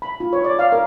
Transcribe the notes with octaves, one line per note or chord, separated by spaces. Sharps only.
B5
F4
C#5
D5
F5
A#4